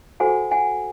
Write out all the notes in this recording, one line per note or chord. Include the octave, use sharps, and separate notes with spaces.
F#4 A4 C5 F#5 G#5
F#5 G#5